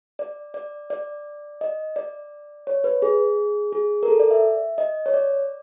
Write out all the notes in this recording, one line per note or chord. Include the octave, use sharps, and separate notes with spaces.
D5
D5
D5
D#5
D5
C#5
B4
G#4
G#4
A#4
A4
D5
E5
D#5
C#5
D5